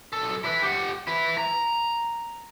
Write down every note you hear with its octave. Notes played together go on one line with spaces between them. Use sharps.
B1 A4
E4 B4
G4 F#5
E4 B4
A#5